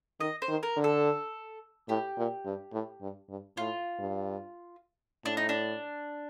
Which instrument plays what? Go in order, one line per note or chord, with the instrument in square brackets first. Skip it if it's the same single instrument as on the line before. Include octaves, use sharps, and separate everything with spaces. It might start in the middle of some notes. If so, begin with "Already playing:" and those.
[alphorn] D#3 [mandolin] D#5
[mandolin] C5
[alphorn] D#3
[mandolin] A#4
[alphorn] D3
[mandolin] A4
[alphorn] A2 [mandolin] G4
[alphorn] A#2
G2
A2
G2
G2
[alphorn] A2 [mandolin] F4
[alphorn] G2
[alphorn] A2 [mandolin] D4
[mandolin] D#4
D4